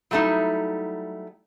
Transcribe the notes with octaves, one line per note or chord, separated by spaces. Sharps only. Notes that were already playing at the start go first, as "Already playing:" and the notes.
F#3 G3 A3 A#3 D#4 E4